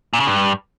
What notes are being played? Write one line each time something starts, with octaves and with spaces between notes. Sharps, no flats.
A#2
C#3
G2